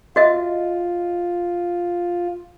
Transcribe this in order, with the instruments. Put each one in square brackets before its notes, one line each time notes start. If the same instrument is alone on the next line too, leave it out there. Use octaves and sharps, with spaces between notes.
[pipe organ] F4 [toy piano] F#4 D#5 E5